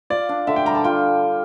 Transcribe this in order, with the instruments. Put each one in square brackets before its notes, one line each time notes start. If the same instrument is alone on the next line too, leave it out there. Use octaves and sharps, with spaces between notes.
[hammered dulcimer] F4 [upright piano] D5
[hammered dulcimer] D4
[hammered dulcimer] D3 [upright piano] E5
[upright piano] G5
[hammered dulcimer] G3 [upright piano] A#5
[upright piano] A5
[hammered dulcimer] F4 [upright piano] G5